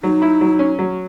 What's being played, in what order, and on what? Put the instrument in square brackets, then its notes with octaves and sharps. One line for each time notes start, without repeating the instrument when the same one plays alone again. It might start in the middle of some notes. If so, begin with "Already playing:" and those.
[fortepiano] F#3 [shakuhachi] D#4
[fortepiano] E4
F#3
C#4
F#3